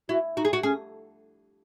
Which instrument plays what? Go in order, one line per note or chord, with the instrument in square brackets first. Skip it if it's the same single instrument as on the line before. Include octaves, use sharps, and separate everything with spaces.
[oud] E4 [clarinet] F#4
[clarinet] D#4 [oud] F#4
[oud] G#4
F#4
[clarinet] C#4 [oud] G#4